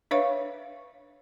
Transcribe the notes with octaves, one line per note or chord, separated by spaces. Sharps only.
D4 B4 C#5 E5 F5 C#6